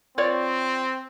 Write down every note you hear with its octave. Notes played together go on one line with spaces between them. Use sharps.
C4 F4 C#5 D5